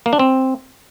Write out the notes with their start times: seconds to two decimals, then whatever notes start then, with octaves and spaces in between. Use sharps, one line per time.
0.06 A#3
0.13 D4
0.19 C4